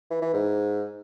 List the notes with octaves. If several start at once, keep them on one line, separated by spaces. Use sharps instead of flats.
E3
E3
G#2